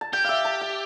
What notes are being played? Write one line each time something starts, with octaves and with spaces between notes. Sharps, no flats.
A5
G4 G5
E5 F5
A5
G5